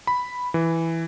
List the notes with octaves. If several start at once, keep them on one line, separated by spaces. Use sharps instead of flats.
B5
E3